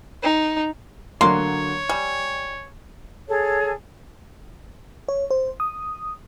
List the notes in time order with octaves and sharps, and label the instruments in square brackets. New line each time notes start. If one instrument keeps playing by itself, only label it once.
[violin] D#4
[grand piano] D3 F#3 [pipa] A#3 [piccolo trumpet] C#5 [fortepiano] C6
[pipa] G3 [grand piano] G#5
[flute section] G#4 A4 C#5
[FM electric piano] C#5
C5
D#6